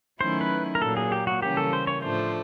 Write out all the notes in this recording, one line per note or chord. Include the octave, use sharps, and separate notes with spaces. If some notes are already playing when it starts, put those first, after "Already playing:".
D#3 F#3 A3 C#4 E4 C5
B4
A#4
A#2 F#3 A#3 A4
G#4
G4
F#4
C#3 E3 G3 A#3 C#4 G4
A4
C5
C#5
A2 F3 A3 D4 C5